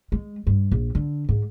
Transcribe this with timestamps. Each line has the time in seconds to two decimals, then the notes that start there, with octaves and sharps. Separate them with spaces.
0.12 G#3
0.47 G2
0.72 A#1
0.95 D3
1.29 G#2